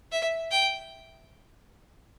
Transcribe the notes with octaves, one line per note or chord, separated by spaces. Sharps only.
E5
G5